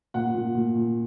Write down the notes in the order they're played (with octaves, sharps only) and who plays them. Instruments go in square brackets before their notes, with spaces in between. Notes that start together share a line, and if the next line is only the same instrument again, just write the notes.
[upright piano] A#2 F#5
A#2
A#2
A#2